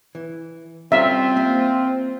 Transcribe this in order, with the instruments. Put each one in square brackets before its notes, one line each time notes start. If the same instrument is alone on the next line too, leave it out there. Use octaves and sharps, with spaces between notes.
[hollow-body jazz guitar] E3
[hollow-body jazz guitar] G3 C#4 F5 [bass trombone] C4 [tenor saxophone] F4 [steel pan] E5
[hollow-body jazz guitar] A#3